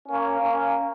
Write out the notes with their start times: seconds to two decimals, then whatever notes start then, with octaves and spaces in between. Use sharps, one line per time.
0.08 A#3 C#4
0.40 A#3 C#4